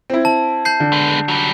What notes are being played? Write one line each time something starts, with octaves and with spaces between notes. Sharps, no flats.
C4 E4
A5
A5 G6 C7
D3
G#3 B3
F#3 G3